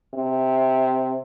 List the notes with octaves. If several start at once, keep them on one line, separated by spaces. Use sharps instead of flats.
C3